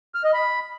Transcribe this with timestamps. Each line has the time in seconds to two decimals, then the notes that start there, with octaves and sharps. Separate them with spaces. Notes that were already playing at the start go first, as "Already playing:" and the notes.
0.15 F6
0.24 D#5
0.34 B5